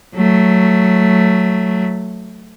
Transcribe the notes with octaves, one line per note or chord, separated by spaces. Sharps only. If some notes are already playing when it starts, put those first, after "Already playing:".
F#3 A3